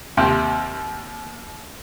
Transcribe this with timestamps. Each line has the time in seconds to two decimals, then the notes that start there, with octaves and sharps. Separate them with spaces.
0.17 D#2 C3